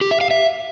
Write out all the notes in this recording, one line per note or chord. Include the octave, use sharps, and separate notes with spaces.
G4
E5
F5
E5